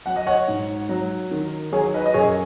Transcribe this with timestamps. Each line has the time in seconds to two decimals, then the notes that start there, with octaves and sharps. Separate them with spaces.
0.06 F#3 F#5
0.16 D#5
0.27 C#5 F#5
0.48 G#2
0.89 F#3
1.31 D#3
1.72 F#3 G#4 C#5
1.94 B4 D#5
2.06 D#5
2.14 F#2 G#4 C#5